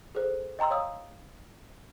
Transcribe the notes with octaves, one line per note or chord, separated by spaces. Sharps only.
G#4 A4 C5
D#5 G5 A#5 C6 E6
C#5 F5 D#6 E6